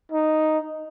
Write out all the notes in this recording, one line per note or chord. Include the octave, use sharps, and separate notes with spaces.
D#4